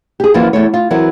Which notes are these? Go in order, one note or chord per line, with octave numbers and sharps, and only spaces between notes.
G4 G#4
F#2 E3 F3 A#3 F4 F#4
E2 A3 C#5
F4
E3 F#3 C4 F#4 A#4